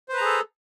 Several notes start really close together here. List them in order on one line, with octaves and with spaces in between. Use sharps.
C5 B4 A#5 G#4 A4